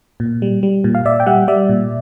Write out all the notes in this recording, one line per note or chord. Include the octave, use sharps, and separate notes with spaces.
A#2
G3
G3
A#2
F5
A#2 D5 E5
G5
G3 E5 F#5
G3 D5 E5
A#2